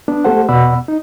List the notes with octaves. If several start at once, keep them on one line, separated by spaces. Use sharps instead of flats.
B3 D4
A3 G4 A4 C5 F#5
E2 B2 D5 F#5 B5 E6
D#4